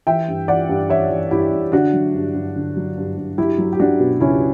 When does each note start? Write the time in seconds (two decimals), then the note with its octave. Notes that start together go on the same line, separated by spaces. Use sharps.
0.07 E3 E5 G5
0.28 G2
0.48 E3 D5 F#5
0.69 G2
0.90 E3 C#5 E5
1.10 E3
1.31 G2 E4 G4
1.51 G2
1.72 D3 D4 F#4
1.93 F#3
2.14 G2
2.34 G2
2.56 D3
2.77 F#3
2.97 G2
3.17 G2
3.38 F#3 E4 G4
3.58 F#3
3.73 G4
3.80 F#3 D4 F#4
4.00 B2
4.20 C#2 C#4 E4